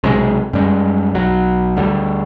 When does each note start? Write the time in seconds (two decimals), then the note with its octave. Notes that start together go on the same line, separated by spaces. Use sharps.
0.04 B1 C3 G#3
0.53 F#2 G3 G#3
1.14 B1 F#3
1.76 D2 D3 G3